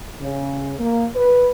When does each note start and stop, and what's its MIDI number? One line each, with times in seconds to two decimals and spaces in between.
0.20 0.72 49
0.78 1.04 58
1.14 1.49 71